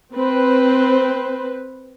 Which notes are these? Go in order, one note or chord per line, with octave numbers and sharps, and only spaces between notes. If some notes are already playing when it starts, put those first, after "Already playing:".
C4 B4 C5